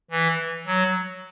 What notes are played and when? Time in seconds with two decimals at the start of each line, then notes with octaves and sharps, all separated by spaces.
0.11 E3
0.67 F#3